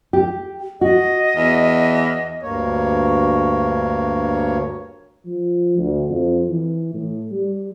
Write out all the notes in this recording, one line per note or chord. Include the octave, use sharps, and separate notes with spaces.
G4
F#4 D#5
E2
D2 G2 A#3 C#5
F3
D2
F2
E3
A2
G3